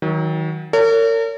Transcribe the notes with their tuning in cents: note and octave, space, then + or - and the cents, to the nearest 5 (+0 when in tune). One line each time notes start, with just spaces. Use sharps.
D#3 +30 F#3 +0
A#4 -40 C#5 +35